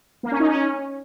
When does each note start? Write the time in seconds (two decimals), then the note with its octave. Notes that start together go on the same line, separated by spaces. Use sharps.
0.23 A#3
0.32 C#4
0.40 D#4
0.48 C#4